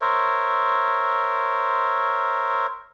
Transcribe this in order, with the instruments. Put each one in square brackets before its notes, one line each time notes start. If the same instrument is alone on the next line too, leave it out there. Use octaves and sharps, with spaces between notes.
[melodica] A#4 C5 C#5 E5